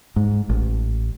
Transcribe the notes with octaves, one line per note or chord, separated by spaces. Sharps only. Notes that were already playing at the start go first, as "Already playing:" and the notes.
G#2
A1